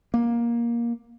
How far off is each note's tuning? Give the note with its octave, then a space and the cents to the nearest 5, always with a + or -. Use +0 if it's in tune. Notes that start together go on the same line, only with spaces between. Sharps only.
A#3 +15